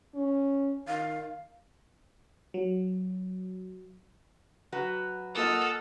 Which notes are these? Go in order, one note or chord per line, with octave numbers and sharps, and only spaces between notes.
C#4
D#3 F5
F#3
F#3 F#4 B4
A#3 F4 A4 D#5 F#5 D#6 F6